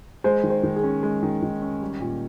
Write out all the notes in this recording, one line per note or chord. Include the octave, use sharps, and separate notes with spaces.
G#3 C5
D#3
C5
D#3
G#4
C#4
G#3
D#3
D#3
C#4
G3
A#2